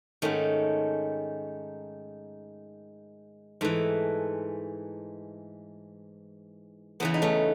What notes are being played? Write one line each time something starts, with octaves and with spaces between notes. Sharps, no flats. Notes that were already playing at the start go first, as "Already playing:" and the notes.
G#2 D#3 A3 C#4
G#2 E3 A3
E2 C#3 E3 B3
D#4
A3 C#4